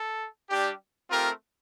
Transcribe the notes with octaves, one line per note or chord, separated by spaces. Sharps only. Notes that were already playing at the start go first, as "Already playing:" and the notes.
Already playing: A4
G3 D4 G4
A3 C4 F4 G4 A#4